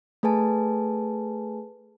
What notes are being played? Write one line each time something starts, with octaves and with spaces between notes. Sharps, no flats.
A3 G#4 B4 G#5 A5